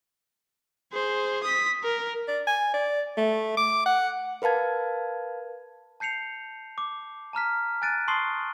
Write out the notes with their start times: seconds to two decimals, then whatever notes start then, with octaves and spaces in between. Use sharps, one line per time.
0.93 G#4 C5
1.43 D#6 B6
1.83 A#4
2.28 D5
2.47 G#5
2.74 D5
3.18 A3
3.57 D6
3.86 F#5
4.42 A#4 B4 F5 A5 G#6
6.00 A5 G6 C7 C#7 F7
6.78 D6
7.33 A5 A#5 F6 B6
7.82 G#5 F#6 A6 D7 D#7
8.08 A5 C6 C#6 D#6 C7 G7